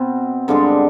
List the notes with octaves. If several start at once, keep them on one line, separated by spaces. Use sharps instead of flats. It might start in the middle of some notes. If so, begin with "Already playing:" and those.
Already playing: B2 C4
G2 D3 G#3 D4